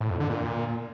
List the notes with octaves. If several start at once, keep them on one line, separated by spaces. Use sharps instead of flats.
A2
F2
D3
A#2